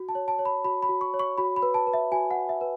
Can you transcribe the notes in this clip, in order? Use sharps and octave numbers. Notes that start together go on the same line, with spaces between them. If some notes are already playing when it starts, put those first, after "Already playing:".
Already playing: F#4
A5
C#5
A5
C#5
B5
F#4 B5
B5
F#4
C#6
C#5
C#6
F#4 B5
B5
B4
A5
B4
E5
F#4 G#5
F#5
F#4
E5
B4